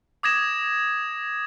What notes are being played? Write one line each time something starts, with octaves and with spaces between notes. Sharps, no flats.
D6 D#6 G#6 A#6 E7